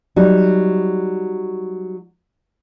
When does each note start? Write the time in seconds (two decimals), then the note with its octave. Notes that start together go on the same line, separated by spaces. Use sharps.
0.16 F#3 G3 D#4